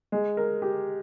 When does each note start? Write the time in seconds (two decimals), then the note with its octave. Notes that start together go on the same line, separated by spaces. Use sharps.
0.12 G#3
0.37 A#4
0.62 G4